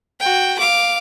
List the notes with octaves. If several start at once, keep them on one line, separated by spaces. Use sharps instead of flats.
F#4 G5
F5 D6